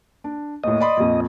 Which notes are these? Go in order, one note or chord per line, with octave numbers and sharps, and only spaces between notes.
D4
D#2 A2 D#5
D5 B5 C6
A#1 F2